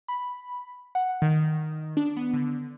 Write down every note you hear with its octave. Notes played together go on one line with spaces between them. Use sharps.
B5
F#5
D#3
D4
B3
D3